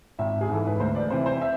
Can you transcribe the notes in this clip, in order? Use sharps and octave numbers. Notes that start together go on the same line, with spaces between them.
G#1 E5
G#4
G#2 E3 A4
B4
D2 C5
D5
C3 E3 C5
C5
E5